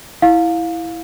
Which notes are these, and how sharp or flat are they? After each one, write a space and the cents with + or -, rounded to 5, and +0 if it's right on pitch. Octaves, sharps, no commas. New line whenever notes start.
E4 +0 F5 +15